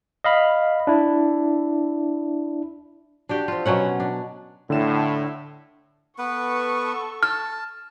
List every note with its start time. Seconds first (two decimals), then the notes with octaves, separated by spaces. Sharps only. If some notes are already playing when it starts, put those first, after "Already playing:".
0.24 D#5 F5 B5
0.87 D4 E4
3.29 D4 F#4 G4
3.48 C4 F4
3.66 B2 F#3 C#4 F#5
4.00 D4
4.70 A2 D3 E7
6.18 B3 A4 B4 C#6
7.23 A5 F6